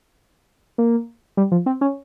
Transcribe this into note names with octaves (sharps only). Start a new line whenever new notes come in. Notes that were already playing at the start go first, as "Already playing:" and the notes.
A#3
G3
F3
C4
C#4